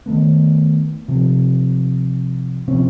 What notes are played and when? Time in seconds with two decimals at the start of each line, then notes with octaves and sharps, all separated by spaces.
0.06 D#3 F#3 A3 B3
1.08 C3 F3
2.68 C3 F3 C4 C#4